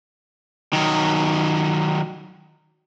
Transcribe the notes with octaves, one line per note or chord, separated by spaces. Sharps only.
D#3 F#3